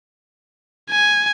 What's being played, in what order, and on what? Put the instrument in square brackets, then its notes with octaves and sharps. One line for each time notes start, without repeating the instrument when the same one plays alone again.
[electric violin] G#5